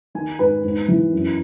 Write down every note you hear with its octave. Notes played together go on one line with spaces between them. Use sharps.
D#3 G#5
G#2 B4
G#2
E3
F#2